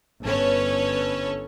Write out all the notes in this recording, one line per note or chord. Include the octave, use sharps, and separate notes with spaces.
G1 C#4 A4 B4 C#5